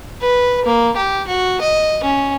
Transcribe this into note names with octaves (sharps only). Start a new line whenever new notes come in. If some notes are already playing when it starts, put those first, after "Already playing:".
B4
A#3
G4
F#4
D#5
C#4